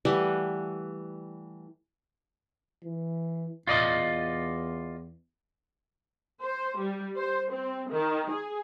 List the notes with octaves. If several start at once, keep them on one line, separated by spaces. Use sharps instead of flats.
E3 G3 A3 F#5
E3
E2 F4 D5 D#5
C5
G3
C5
C4
D#3
G#4